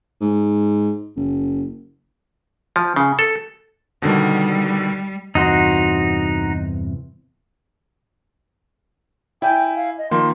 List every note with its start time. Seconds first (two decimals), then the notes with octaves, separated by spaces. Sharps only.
0.21 G#2
1.16 F#1
2.76 F3
2.96 C#3
3.19 A4
4.02 B2 D3 D#3 G3
5.35 E2 G2 C3 D#4 F#4 C5
9.42 E4 D5 G5 G#5
9.76 F5
9.98 D#5
10.11 D#3 F3 A#3 C6